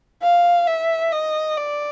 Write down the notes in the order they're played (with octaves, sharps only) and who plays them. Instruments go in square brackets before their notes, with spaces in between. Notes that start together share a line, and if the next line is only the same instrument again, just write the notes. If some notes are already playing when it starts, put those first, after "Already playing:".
[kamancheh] F5
E5
D#5
D5